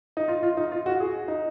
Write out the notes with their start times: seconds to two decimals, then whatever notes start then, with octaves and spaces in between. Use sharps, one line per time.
0.17 D#4
0.28 F4
0.43 F4
0.57 D#4
0.72 F4
0.86 F#4
1.00 G#4
1.28 D#4